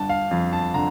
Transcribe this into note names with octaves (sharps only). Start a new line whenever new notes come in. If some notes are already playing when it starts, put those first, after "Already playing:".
Already playing: G1 A5
F5
F2
A5
D3 A#5